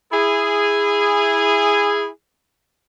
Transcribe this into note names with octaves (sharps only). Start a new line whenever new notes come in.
E4 G#4